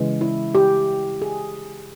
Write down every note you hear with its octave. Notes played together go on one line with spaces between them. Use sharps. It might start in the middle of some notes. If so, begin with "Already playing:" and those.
Already playing: C#3 E3 G#3
E4
G4
G#4